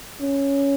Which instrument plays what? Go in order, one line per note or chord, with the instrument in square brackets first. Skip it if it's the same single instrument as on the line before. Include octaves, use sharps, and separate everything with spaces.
[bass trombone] C#4